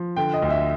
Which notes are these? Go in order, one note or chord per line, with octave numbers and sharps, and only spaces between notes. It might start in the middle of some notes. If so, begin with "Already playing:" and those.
Already playing: F3
D3 G5
D#5
D2
E5